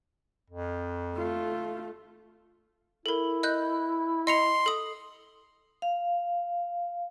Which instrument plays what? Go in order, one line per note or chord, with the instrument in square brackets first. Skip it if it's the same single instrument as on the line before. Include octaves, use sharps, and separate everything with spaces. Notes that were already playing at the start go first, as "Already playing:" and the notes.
[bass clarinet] F2
[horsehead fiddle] A3 F4
[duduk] E4 [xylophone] A4 A#4
[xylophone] D#5 F#6 G6
[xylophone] D#5 C#7 F7 [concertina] C6
[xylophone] A4 D#6
[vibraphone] F5